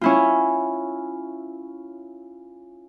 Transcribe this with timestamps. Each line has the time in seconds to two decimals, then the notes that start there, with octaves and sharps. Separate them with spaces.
0.01 C#4 E4 F4